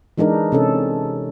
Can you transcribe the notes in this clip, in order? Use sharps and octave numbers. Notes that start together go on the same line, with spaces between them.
E3 G#3 D4 D#4 A#4
C3 C#4 A4